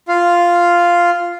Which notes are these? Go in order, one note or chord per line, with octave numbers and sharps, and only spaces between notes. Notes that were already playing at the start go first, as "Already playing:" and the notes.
F4 F5